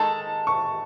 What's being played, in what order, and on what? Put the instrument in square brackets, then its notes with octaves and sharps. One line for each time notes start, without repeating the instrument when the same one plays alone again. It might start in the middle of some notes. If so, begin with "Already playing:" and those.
Already playing: [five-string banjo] D#3 G#3 D#4 A4 [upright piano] A5
[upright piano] C#6